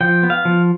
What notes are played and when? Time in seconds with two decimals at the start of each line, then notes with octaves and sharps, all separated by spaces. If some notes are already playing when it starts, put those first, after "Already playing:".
0.01 F3 G5
0.23 B3
0.30 F5
0.45 F3